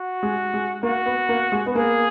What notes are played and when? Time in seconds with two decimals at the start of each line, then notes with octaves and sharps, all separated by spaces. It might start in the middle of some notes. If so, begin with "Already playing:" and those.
Already playing: F#4
0.23 G#3
0.54 G#3
0.83 A#3 F#4
1.06 B3
1.29 A#3
1.52 G#3
1.66 B3
1.75 A#3 G#4